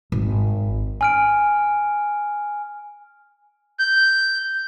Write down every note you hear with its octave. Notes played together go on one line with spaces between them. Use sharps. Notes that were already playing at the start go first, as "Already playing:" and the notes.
G#1
G#5 F6 D7
G6